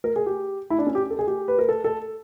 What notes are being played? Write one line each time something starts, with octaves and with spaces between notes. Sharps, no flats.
A#4
G#4
G4
E4
D4
C#4
G4
A4
G#4
G4
B4
A#4
A4
A4